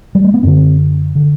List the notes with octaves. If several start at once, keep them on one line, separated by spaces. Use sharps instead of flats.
G3
A3
B3
F#2 D3 C4
D3